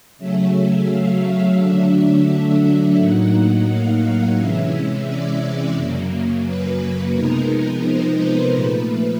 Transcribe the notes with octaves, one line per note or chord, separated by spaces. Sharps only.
C#3 F#3 A3 C#4 E5
F5
D3 F#3 A3 D4 E5
E5
A2 F#3 A#3 D#4 F#5
F5
C3 E3 G#3 C#4 E5
D5
F#2 C#3 F#3 A#3
B4
C3 F3 G#3 B3 D#4 A#4
C5
B4
A#2 F3 A3 B4